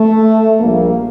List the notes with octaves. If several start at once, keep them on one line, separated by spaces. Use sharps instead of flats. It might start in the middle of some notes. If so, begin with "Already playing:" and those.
Already playing: A3
A#1 A#2 G3 A#3